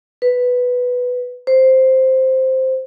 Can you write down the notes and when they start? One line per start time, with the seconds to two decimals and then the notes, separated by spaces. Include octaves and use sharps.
0.22 B4
1.47 C5